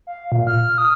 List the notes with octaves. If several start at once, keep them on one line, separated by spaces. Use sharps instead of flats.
F5
A#2
F6
D#6